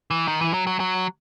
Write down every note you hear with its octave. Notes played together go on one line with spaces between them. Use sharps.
E3
D#3
E3
F#3
F#3
F#3